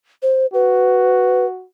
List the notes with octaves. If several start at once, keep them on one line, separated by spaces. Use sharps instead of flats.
C5
F#4 B4